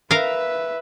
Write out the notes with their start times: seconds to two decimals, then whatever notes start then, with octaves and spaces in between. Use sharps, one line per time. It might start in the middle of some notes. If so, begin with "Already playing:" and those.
0.11 A#4 B4 E5 F5